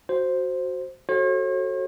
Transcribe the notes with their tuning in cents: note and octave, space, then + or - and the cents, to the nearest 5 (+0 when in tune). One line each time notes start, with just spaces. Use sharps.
F#4 +0 C5 +0
F#4 +10 A4 +0 C#5 -45